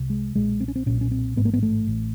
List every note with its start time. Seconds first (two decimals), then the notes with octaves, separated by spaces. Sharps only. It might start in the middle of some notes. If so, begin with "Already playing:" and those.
Already playing: C2 C3
0.10 G#3
0.35 B1 A#2 G#3
0.60 C4
0.68 C#4
0.76 C4
0.86 B1 A#2 C#4
1.01 C#4
1.11 C4
1.36 A1 G#2 B3
1.45 A#3
1.53 B3
1.63 A3
1.87 A1